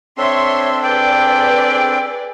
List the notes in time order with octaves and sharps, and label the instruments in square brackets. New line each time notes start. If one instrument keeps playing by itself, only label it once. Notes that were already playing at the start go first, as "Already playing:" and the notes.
[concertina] C4 D4 A4 [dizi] C#5 [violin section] E5 C6
[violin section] G#4 B4 D5 [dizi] G5